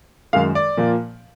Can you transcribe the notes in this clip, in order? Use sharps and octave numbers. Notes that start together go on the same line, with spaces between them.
F#2 D#3 G#3 F5
D5
A#2 F3 A#3